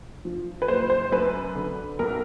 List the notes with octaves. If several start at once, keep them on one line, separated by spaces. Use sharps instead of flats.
F3
B4
F#1 C5
C5
F#2 B4
D3
B1 A#4